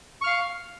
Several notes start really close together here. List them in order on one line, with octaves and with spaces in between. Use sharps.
C#6 F6 F5